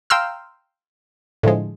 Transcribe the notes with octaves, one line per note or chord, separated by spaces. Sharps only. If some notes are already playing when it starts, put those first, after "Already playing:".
F5 G5 A#5 C6 E6 F6
A2 D3 F3 G#3